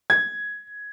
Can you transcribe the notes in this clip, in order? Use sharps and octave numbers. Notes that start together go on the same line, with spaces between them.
G#6